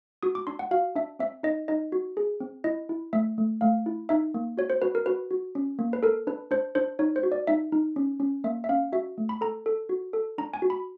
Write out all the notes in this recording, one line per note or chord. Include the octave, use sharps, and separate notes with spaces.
F#4 D#6
D6
D4 C6
F#5
F#4 F5
D4 E5
C4 E5
D#4 D#5
D#4 D#5
F#4
G#4
C4
E4 D#5
E4
A3 E5
A3
A3 F5
E4
D#4 E5
A#3
F#4 C#5
C5
F#4 B4
A#4
F#4 B4
F#4
C#4
A#3
B4
A4 A#4
D4 B4
D4 C5
D4 C5
D#4 C#5
C5
F#4
D5
D#4 E5
D#4
C#4
C#4
A#3 E5
E5
C#4 F5
F#4 E5
A3
B5
A4 A#5
A4
F#4
A4
D4 A#5
G#5
F#4
B5